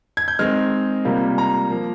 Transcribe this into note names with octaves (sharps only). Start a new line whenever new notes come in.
G#6
G6
D#3 G#3 C4 F6
C3 G3 A#3 F4
A#5
F3 A#3